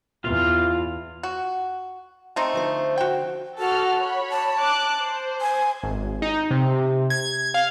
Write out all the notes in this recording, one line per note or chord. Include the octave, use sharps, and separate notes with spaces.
E2 F4 F5
F#4
A3 C4 D#4
D3 F3 C5
F#4 G5
F#4 A4 A5 F6
C#5 B5
A5
D6 F#6
C5
G#5
G#1
D#4
C3
G#6
F5